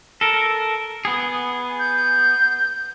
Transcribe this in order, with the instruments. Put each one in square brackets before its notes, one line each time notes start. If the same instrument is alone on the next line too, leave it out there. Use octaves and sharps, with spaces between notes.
[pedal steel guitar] A4 A#4
B3 G#4
[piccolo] G6